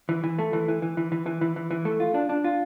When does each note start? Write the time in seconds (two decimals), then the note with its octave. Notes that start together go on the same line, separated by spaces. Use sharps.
0.09 E3
0.24 E3
0.38 A3
0.53 E3
0.68 E3
0.82 E3
0.97 E3
1.12 E3
1.26 E3
1.41 E3
1.56 E3
1.71 E3
1.85 A3
2.00 F4
2.14 D4
2.29 D4
2.44 F4